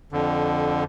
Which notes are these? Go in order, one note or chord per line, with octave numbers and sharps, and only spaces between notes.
F2 D3